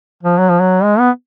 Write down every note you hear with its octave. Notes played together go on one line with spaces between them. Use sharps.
F3
F#3
F3
F#3
G#3
B3